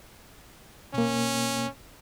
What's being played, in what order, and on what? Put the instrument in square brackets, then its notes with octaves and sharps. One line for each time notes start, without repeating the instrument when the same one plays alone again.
[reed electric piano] B2 A#3 [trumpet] C#4